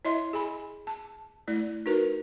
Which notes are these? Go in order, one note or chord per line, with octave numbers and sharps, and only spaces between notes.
E4 C#5 D#5 E5 C6
G#4 G#5 B5
A5
A3 E4 D5
D#4 F#4 A#4 B4